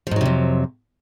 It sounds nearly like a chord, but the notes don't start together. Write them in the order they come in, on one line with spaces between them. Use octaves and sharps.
F3 G#2 F#3 C3 F2